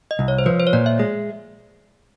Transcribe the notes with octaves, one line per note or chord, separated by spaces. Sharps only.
D#5
C2
C#5
C5
F3 B4
C5
C#5
A#2 D5
E5
G#3